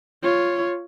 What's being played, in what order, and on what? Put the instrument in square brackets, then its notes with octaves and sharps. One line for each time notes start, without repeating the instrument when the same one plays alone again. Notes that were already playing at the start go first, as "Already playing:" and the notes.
[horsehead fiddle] F4 C#5